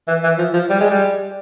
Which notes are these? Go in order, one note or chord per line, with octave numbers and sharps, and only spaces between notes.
E3
E3
F3
F3
G3
G#3
G3